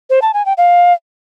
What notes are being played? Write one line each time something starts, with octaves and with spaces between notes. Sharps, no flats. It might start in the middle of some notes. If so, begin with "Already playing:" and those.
C5
A5
G#5
G5
F5